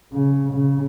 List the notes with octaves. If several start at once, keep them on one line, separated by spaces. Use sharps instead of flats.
C#3
C#3